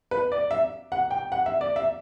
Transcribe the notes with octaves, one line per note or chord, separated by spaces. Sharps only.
B4
D5
E5
F#5
G5
F#5
E5
D5
E5